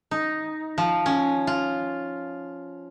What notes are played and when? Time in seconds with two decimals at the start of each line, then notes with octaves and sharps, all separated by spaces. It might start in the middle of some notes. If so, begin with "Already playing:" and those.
0.11 D#4
0.78 F3
1.06 C#4
1.47 F4